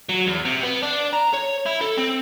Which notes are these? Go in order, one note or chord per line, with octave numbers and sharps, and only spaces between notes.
F#3
E2
C3
B3
D4
A#5
C#5
E4
A4
C4